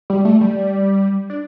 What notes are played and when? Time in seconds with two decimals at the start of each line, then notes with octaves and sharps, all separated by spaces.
0.10 G3
0.25 A3
0.41 G3
1.30 D4